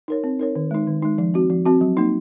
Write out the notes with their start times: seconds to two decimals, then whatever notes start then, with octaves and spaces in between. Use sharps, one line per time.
0.08 D#4 A#4 C#5
0.24 C4
0.39 D#4 A#4 C#5
0.56 D#3
0.71 G#3 D#4
0.87 D#3
1.02 G#3 D#4
1.18 F3
1.34 C4 F#4
1.50 F3
1.66 C4 F#4
1.81 F#3
1.97 A#3 D#4